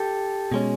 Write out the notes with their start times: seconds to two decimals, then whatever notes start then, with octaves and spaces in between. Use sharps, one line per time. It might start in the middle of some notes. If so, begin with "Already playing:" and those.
Already playing: G4 A4
0.52 B2 G#3 C#4